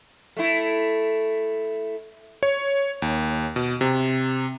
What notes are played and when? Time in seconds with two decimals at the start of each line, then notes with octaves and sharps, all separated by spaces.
0.37 A3 E4
2.43 C#5
3.02 D#2
3.56 B2
3.81 C3